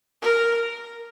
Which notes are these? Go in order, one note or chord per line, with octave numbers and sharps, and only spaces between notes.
A#4